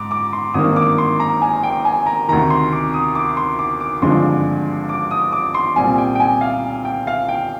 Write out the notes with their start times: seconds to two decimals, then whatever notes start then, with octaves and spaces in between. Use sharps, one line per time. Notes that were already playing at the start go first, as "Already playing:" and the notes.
Already playing: G#2 D6
0.11 D6
0.33 C6
0.54 G#1 G2 D#3 A#3 D#6
0.76 D6
0.98 C6
1.20 A#5
1.42 G#5
1.63 G5
1.85 G#5
2.06 A#5
2.28 D2 C3 D#3 A#5
2.50 C6
2.72 D6
2.94 D#6
3.15 D6
3.37 C6
3.59 D6
3.80 D6
4.02 G#1 G2 D3 F3 G#3 C6
4.89 D6
5.11 D#6
5.32 D6
5.54 C6
5.76 C2 A#2 G3 C4 G#5
5.98 G5
6.15 G5
6.20 G#5
6.41 F5
6.85 G5
7.07 F5
7.28 G5